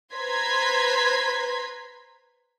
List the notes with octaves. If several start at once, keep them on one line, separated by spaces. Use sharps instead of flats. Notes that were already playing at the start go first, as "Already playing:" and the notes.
B4 C5 A#5 C6 G#6 B6